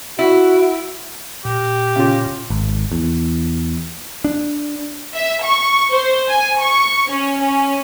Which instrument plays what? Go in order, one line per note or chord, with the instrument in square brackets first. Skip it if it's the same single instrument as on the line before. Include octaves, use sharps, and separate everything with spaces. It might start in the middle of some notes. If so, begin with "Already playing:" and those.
[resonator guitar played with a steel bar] E4 [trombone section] F#4
[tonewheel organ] A#2 [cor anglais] G4
[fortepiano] C#3 F4
[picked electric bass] G#1
E2
D4
[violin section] E5
C#6
C5
G#5
C#6
C#4
C#4